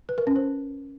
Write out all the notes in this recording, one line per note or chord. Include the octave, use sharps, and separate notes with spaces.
B4
A#4
C#4
C5